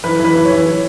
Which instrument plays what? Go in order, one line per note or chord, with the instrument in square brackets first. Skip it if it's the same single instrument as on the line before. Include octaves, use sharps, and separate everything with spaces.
[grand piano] E3 B4
E3
B4
E3
C#5
E3
E3